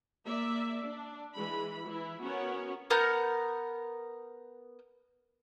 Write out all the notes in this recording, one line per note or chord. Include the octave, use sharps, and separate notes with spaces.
A#3 D5 E5
D4
E3 G#3 B5
E3 E4
B3 C#4 F#4 A#4 C#5
B3 A#4 F#5 G6